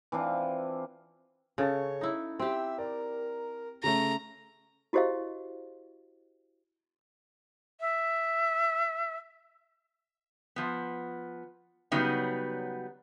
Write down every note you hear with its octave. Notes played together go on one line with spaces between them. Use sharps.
E3 C4 D4 F4
C#3 C#4 A4 C#5 A6
D#4 E4
C4 G4 E5
A#4 D5
C#3 A3 A#5
E4 F#4 G4 C5 D#5 F5
E5
F3 B3
C#3 F#3 G3 B3 D#4